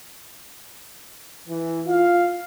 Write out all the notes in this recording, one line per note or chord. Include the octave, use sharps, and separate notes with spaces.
E3
F4 F5